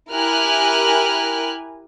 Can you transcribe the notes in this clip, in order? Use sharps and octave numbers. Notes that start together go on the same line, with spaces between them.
E4 G4 A#4 G#5 F6 F#6